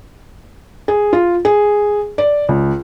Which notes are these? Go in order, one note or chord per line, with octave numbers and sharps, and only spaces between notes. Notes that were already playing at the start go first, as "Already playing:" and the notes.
G#4
F4
G#4
D5
C#2